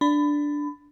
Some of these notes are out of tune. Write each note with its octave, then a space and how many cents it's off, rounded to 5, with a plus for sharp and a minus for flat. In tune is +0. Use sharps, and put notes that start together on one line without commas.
D4 +0 B5 +25